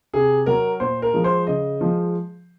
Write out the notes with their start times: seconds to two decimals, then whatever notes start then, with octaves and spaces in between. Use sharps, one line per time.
0.13 C3 G#4
0.46 F#3 A#4
0.80 A#2 C5
1.02 A#4
1.13 F3 G#3
1.24 C5
1.47 C#3 D#5
1.81 F3 G#3